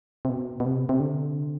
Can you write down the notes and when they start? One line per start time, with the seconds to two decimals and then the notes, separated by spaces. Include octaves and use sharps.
0.25 C3
0.29 B2
0.60 B2
0.65 C3
0.89 C3
1.00 D3